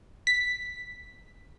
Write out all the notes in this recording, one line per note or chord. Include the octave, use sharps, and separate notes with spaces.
B6